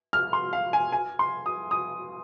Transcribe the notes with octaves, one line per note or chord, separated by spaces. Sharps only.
F6
C6
F5
G#5
G#5
C6
D#6
D#6